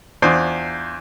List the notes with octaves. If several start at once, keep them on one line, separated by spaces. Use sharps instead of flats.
E2 D4 F4 C5 D#6